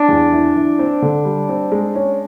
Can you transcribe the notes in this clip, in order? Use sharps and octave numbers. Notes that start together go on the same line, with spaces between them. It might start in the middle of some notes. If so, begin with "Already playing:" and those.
Already playing: D4
E2
E3
E3
C4
D3
G3
C4
G#3
C#4